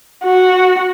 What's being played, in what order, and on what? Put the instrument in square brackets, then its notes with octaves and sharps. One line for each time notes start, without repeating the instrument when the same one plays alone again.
[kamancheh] F#4